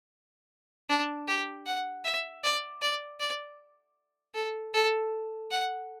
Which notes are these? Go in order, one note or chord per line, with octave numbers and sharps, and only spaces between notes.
D4
G4
F#5
E5
D5
D5
D5
A4
A4
F#5